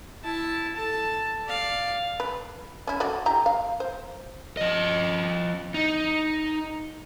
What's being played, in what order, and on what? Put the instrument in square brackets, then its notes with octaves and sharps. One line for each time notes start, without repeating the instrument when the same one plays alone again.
[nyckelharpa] E4 A5
A4 A5
D5 F5
[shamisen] B4
C#4 E4
D3 F#4 D5
E4 G4 A#5
F5
C5
[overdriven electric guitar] F3 D#5
D#4